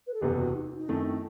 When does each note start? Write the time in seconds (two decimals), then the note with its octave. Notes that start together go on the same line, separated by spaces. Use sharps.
0.07 B4
0.14 A4
0.21 F#1 E2 C3 E3 B3 G4
0.38 F#4
0.55 D#4
0.78 D#4
0.89 F#2 D#3 A3 C4 E4